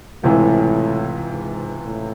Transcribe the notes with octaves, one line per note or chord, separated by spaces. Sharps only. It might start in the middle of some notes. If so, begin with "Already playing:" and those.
C#2 A2 C3 E3
G#2
A2